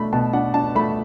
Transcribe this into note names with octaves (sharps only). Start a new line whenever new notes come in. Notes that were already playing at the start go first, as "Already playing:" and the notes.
Already playing: B2 A3 D4 B5
B2 A5
D4 F#5
D4 A5
A3 B5